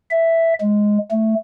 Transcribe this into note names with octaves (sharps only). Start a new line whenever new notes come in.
E5
G#3
A3